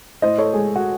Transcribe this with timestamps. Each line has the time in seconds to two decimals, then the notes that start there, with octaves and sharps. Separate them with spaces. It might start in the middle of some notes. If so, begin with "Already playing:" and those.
0.22 A2 C5 D#5
0.38 A4 C#5
0.54 G#3 G#4
0.76 F#4